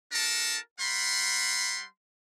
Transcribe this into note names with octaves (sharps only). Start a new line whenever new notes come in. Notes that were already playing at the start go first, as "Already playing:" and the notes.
D4 F#4 A4 A#4 A5
G3 F#5 B5 C6